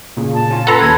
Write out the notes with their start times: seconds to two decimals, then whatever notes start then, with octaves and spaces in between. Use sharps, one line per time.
0.17 A#2 C#3
0.34 A5
0.51 C#4 F4
0.67 A4 B4 F#5 A#5 C6
0.80 D#2 B4 G#6